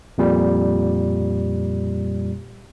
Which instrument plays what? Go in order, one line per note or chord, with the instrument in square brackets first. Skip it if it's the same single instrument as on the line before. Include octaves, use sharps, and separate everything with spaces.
[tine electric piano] F2 A#2 G3